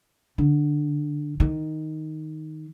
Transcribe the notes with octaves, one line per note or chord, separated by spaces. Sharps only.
D3
D#3